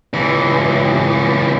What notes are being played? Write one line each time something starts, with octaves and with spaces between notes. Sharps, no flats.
C#2 E3